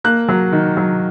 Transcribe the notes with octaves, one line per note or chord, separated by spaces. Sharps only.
A#3 F#6
F#3
D#3
F#3